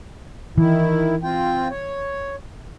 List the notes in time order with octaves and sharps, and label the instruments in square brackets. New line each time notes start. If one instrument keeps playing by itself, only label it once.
[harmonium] D#3 E4 [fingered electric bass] E3
[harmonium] C4 F4 G5
C#5